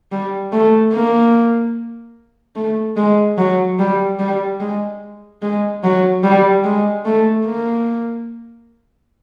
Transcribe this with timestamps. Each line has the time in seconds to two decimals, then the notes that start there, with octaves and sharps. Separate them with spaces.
0.12 G3
0.53 A3
0.93 A#3
2.56 A3
2.97 G#3
3.38 F#3
3.79 G3
4.19 G3
4.60 G#3
5.42 G#3
5.83 F#3
6.24 G3
6.64 G#3
7.05 A3
7.46 A#3